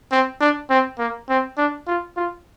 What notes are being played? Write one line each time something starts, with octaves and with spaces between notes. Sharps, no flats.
C4
D4
C4
A#3
C4
D4
F4
F4